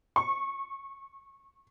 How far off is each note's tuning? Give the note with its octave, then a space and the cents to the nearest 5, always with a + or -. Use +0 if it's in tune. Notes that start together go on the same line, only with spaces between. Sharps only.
C#6 -20